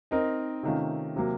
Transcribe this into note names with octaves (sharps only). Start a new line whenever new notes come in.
C4 D#4 A#4 D#5
C3 D#3 A3 C#4 F4
C3 F#3 A#3